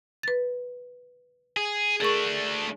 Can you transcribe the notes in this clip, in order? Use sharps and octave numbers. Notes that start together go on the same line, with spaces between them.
B4 A6
G#4
A3 D4 G#4 A#4 C#6